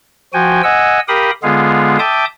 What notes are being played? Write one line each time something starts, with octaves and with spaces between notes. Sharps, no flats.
F3 F#4 G5 G#5
D#5 F#5 G#5 E6
G4 A#4 F5 G5 B5 D#6
D3 G#3 B3 F4 G#4 F5
E5 G5 A5 D6 D#6 G6